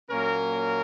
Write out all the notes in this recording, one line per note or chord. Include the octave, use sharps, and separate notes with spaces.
A#2 F#3 A#3 C#4 A#4